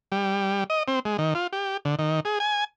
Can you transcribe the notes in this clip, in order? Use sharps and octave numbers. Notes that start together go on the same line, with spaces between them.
G3
D#5
C4
G#3
D#3
F4
G4
D3
D#3
G#4
G#5